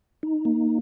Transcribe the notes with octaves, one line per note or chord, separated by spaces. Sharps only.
D#4
A#3